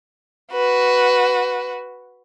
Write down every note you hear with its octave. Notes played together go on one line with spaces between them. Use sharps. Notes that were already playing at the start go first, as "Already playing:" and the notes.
F#4 B4